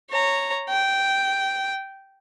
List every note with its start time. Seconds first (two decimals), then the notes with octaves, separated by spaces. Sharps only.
0.10 C#5 A#5
0.70 G5